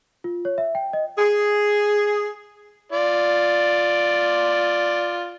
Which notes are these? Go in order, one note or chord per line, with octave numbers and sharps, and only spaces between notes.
F4
C#5
E5
G5
D#5
G#4
F4 D5